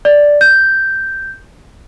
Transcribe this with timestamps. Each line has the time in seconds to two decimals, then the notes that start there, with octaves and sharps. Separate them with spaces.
0.05 D5
0.41 G6